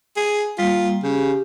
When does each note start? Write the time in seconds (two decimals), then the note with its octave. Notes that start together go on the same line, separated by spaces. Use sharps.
0.17 G#4
0.59 G3 A#3 F4
1.03 C#3 G4